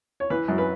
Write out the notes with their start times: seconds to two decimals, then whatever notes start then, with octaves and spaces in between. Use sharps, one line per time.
0.20 C#5
0.30 E3 B4
0.48 F#2
0.58 B4